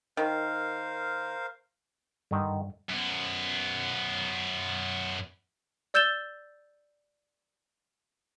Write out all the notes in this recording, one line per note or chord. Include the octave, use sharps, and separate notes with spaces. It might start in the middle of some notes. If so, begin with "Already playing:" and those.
D#3 A#4 C5 F5
G2 D3 D#3
F#2 B3
D5 E6 G6 A6 E7 G7